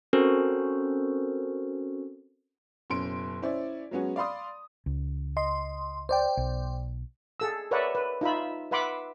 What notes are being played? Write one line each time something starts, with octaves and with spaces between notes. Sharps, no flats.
C4 C#4 F#4 A4 A#4 C5
F#1 B2 C#4 C6 D7
C#4 E4 C5 D5
F#3 G#3 B3 C#4 F#4
D5 F5 B5 C6 D#6
C#2
D#5 C6
C5 D5 G5
B1
G#4 A4 E6
A#4 B4 C#5 D5 E5 F#5
B4
D#4 F4 E5 B5
B4 E5 F#5 B5 C6 D6